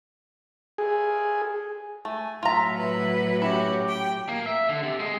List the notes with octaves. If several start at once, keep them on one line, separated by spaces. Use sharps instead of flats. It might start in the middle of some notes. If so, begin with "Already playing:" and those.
G#4
A3 G#5
A2 F#3 F4 E5 A#5
B4 E5
C#4 E4 F#4 G4
G5
A#3
E5
D3
C3
G#3